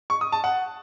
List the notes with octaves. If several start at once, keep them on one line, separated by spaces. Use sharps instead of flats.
C#6
D#6
A5
F#5